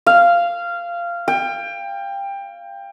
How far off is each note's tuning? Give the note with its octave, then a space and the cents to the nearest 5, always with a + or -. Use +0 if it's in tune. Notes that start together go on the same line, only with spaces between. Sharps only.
F5 -15
G5 +20